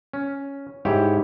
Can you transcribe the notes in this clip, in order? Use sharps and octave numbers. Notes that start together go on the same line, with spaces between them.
C#4
G#2 E4 G4 C#5